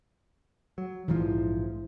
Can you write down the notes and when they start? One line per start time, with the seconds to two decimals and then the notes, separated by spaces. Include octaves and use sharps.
0.78 F#3
1.08 A#1 G#2 E3 F3